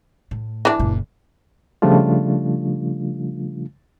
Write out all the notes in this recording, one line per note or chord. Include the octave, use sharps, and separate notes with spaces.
A2
E3 D4
F#1 A#2
C#3 F3 G3 A3 D4 F4